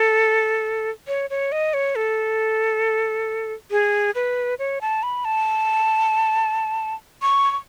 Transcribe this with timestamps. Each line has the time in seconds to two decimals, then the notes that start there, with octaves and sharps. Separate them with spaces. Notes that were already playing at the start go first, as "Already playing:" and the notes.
Already playing: A4
1.08 C#5
1.30 C#5
1.52 D#5
1.74 C#5
1.96 A4
3.71 G#4
4.15 B4
4.59 C#5
4.81 A5
5.03 B5
5.25 A5
7.22 C#6
7.51 C#6